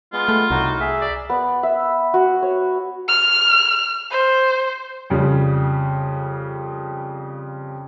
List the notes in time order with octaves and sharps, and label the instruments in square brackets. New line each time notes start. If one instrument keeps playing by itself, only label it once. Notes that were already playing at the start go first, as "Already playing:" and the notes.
[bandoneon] G#3 B3 [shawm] F4
[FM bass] A3
[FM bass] C2 [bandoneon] A2 D#4 F#4
[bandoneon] G#4 E5
[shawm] D5
[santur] B3
E5
F#4
C#5
[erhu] F6
C5
[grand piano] F2 C#3 G3